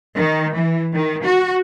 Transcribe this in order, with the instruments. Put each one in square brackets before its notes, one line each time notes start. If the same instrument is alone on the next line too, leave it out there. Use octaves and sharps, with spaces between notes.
[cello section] D#3
E3
D#3
F#4